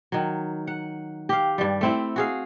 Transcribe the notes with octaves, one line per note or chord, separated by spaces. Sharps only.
D#3 F#3
F#5
G4 F5
G2 G3
A3 C4 E4
F#4 G#4 F5